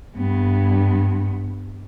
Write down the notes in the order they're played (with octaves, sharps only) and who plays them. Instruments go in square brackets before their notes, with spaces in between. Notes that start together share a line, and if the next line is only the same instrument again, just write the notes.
[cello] G2 B3